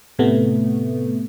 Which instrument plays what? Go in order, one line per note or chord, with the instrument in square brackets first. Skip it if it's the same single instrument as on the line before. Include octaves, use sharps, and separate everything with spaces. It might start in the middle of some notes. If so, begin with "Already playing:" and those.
[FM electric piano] A2 C3 A3 B3